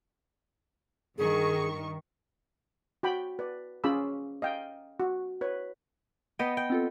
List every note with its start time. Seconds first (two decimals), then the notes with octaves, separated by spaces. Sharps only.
1.18 G2 D#3 G#4 C#6
3.03 F#4 G5 B5
3.39 B4 D5
3.84 C#4 F4 G#4 B5 D6 E6
4.42 D#5 F5 G5
5.00 F#4
5.41 B4 C#5
6.39 B3 D#5 G5
6.57 G5
6.70 C4 F4 A4